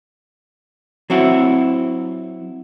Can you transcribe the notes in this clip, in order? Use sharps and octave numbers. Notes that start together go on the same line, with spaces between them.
F#3 C4 E4 F#4